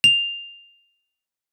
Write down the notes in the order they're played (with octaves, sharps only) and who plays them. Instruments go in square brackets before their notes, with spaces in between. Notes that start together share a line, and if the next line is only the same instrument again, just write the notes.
[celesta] F7